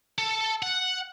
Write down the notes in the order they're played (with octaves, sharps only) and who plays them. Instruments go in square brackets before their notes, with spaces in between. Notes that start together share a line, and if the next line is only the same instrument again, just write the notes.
[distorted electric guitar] A4
F#5